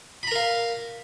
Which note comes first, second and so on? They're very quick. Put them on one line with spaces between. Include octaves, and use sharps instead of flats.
B5 A#5 A#4 F5